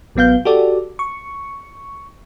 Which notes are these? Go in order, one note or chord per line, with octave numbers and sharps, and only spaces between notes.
A1 F#3 B3 F5 G6
F#4 G4 A4 D5
C#6